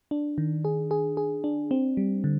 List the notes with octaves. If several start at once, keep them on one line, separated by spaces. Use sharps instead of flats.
D4
D#3
G#4
G#4
G#4
D4
C4
G3
D3